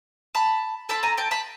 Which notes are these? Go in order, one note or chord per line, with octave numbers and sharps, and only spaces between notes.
A5 B5
C4 E4 A4 A5 B5
G#5 A#5
G5 A5
A5 B5